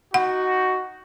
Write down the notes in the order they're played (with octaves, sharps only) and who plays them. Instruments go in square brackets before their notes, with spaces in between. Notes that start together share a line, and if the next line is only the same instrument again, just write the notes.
[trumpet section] D#4 F#4 [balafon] F#5